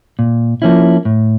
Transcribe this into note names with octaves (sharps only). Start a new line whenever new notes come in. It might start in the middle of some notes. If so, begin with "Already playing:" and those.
A#2
F3 A#3 C#4 E4
A2